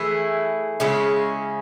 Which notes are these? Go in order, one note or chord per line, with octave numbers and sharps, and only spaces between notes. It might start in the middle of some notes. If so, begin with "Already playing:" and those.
Already playing: E3 A3 E4 G#4
C#3 G#3 C#4 E4